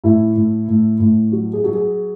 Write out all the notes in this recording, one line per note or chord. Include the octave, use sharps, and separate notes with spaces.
A2 E4
A2
A2
A2
F#3 F#4
G#4
F#3
G#4